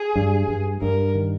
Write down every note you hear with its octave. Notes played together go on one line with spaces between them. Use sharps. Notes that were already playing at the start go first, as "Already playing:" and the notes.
Already playing: G#4
G2
G2
G2 A#4
D#3